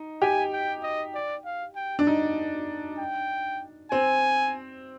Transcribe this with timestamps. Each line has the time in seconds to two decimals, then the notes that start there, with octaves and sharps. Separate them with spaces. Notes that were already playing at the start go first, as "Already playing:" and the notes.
Already playing: D#4
0.22 G4 G#5
0.53 G5
0.83 D#5
1.15 D5
1.45 F5
1.76 G5
1.99 D4
2.07 D#4
2.99 G5
3.91 C4 G#5